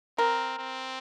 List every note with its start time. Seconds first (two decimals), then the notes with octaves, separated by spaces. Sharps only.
0.18 C4 A#4
0.59 C4